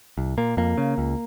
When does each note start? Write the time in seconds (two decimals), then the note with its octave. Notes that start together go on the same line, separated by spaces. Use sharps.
0.18 C2
0.38 A#2 A#3
0.57 F2 A#3
0.78 C#3
0.98 C#2